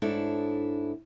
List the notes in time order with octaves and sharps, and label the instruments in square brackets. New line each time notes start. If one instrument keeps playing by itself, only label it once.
[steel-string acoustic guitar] G#2 D4 E4 A4 C#5